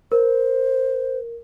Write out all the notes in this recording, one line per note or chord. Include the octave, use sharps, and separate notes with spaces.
A#4 C5